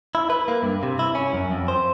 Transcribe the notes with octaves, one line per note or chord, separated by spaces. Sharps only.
E4
B4
A#3
G2
C3
E4
C#4
F#2
F2
C5